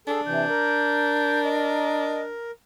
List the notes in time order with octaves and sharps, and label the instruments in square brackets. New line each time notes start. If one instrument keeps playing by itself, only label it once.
[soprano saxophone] D4 [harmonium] G#4 A4
[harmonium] C3 E3 [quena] G6
[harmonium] A#4
[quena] D#5